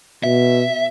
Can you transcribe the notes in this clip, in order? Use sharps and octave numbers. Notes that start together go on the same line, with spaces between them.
B2 E5